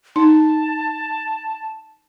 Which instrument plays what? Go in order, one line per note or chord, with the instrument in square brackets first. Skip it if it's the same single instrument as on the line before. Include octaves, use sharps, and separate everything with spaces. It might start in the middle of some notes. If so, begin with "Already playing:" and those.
[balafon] D#4 [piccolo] A5